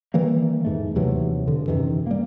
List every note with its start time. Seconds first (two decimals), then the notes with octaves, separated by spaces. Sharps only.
0.14 D#3 E3 G3 A#3
0.65 E2 G#2 A3
0.95 D#2 C3 E3 F#3
1.47 E1 D3
1.68 F#2 C3 D#3 E3
2.07 G3 A#3